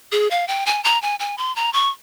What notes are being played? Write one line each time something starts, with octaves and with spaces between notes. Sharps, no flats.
G#4
F5
G5
G#5
A#5
G#5
G#5
C6
A#5
C#6